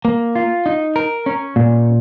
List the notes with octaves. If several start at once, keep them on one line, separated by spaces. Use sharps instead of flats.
A#3
F4
D#4
A#4
C#4
A#2